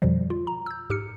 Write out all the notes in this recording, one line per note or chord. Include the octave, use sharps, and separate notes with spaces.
F2 B2 D3 F3 G3
F4
A#5
E6 G6
G#2 G4 F6 C#7